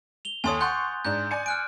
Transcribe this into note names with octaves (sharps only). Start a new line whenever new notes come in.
F7 G7
D#2 A4 C#5 G#5 C6 D#6
F#5 C6 C#6 F#6 G6 A6
G#2 D4 G6
D5 G#5 C#7
F6 F#6 D7